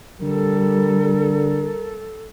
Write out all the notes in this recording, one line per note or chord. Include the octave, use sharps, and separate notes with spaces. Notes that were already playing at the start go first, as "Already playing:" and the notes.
D3 G3 A4 A#4